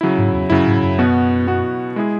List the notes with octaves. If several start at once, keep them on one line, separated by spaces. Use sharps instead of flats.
C#3 F#3 E4
G#2
E2
F#2 C#3 F#3 E4
G#2
F#2
B2 B3 F#4
B2 B3 F#4
G#3 E4 G#4